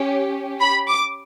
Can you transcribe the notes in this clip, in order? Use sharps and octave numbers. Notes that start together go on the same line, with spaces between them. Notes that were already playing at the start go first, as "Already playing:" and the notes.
Already playing: C#4 G4
B5
D6